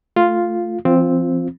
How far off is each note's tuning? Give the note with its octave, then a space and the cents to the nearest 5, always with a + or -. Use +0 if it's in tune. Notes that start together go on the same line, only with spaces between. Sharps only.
A3 +0 F4 +0
F3 -45 C4 +0 F4 +0